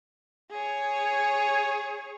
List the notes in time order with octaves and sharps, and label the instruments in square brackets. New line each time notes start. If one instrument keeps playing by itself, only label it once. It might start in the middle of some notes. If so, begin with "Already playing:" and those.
[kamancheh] G#4 C#5